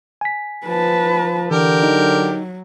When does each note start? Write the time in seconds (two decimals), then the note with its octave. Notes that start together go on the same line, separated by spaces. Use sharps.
0.21 G#5 B6
0.66 F3 B4 A5
1.51 D3 E3 G4 A#4
1.83 F#3 D#4